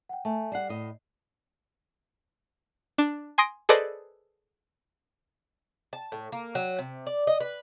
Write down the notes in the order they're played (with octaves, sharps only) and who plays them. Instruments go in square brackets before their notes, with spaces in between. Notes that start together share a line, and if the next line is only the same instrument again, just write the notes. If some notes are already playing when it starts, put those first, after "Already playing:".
[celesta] F#5 G5
[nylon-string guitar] A3 [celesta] E5 G#5 A5
[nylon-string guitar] G3 F#5 [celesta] D5 C7
[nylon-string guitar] A2 D#5
[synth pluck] D4
G#5 C6 D#6 A#6 D7
G#4 A4 B4 C5 D5 D#5
[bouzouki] A5
A2
A#3
F#3
C3
D5
D#5
B4